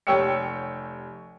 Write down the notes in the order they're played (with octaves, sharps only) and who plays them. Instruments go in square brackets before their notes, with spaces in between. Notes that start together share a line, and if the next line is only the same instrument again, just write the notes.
[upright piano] F1 G4 C#5 G5 E6 C#7